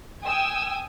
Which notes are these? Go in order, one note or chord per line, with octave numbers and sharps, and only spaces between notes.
G5 G#5 D#6 E6